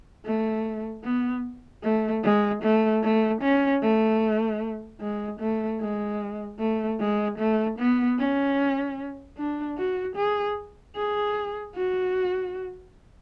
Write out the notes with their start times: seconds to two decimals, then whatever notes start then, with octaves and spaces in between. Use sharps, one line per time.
0.25 A3
1.04 B3
1.83 A3
2.24 G#3
2.63 A3
3.03 A3
3.42 C#4
3.82 A3
5.01 G#3
5.40 A3
5.81 G#3
6.59 A3
6.99 G#3
7.39 A3
7.79 B3
8.19 C#4
9.37 D4
9.77 F#4
10.16 G#4
10.96 G#4
11.76 F#4